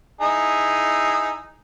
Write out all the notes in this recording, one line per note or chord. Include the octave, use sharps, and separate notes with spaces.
D#4 E4 G#4